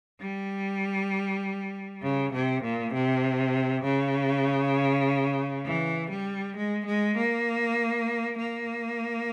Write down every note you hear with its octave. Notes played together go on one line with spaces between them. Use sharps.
G3
C#3
C3
A#2
C3
C#3
E3
G3
G#3
G#3
A#3
A#3